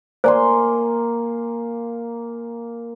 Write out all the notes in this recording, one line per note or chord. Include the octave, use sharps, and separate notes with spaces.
A#3 C5 D5 G#5 C6